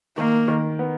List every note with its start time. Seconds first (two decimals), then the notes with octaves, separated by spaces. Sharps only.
0.18 D#3 A#3
0.48 D#3
0.79 B3